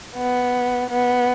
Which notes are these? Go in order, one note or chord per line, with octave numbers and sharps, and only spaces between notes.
B3
B3